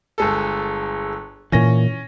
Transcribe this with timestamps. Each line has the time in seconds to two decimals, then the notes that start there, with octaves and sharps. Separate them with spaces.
0.18 G1 G#3 A4
1.52 A#2 E3 C#4 A#6